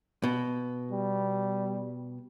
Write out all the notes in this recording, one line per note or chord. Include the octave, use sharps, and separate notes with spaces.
B2
G3